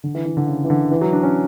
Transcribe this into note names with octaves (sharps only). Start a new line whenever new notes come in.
D3
E3
E3
D3
C#3
E3
D3
E3
F#3
D4
C#4